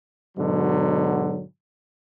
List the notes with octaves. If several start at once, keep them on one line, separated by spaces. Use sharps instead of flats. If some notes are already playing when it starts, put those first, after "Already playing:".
G#2 B2 D3 F#3